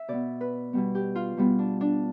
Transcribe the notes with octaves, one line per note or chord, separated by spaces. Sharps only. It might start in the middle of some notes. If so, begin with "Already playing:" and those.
Already playing: E5
B2 B3 D5
B4
B2 G3 B3
G4
F4
B2 G3 B3
D4
D4